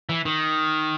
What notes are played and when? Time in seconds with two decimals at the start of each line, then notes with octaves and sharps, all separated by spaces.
0.09 E3
0.25 D#3